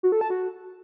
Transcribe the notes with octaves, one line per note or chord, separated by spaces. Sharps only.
F#4
A4
A5
F#4